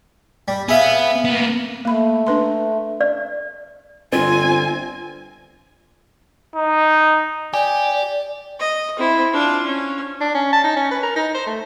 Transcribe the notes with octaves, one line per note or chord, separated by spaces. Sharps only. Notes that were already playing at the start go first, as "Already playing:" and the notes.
G3
B3 G#4 E5 F5
A#3 B3
A3 A#3 B5
D4 B4 C6
D5
G1 C4 F4 G#5
D#4
G4 D5 G#5
D#5
C4 E4
D4 F4
C#4
D4
C#4
A5
D#4
C#4
B4
A#4
D#4
C5
A3